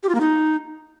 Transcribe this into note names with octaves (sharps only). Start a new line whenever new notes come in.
G4
F4
A#3
D#4